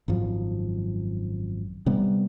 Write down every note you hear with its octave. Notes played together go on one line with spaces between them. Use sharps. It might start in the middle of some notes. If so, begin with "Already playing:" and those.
G#1 F#2 F3
C3 G3 B3